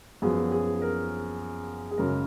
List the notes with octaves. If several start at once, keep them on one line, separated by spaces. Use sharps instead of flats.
F#2 F3 B3 G#4
G#4
A#4
G#4
F#2 C#3 G#3 A#4